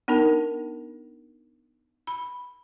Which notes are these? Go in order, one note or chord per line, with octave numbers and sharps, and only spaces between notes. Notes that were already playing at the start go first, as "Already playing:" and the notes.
B3 D4 D#4 A#4
B5